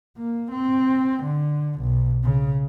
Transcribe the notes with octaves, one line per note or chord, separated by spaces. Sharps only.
A#3
C4
D3
B1
C#3